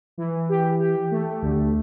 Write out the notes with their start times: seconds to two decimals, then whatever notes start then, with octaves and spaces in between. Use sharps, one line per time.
0.18 E3
0.49 G4
0.80 G4
1.11 A3
1.42 D2